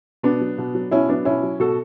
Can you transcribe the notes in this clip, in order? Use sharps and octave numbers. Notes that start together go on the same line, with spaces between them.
B2 B3 D4
F#3
B2
F#3
B2 C#4 E4
F#3 B3 D4
B2 C#4 E4
F#3
B2 F#4 A4